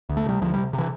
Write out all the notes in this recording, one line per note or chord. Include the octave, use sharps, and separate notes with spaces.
D2
A3
C3 G3
D2 F3
G3
C3
C3
E3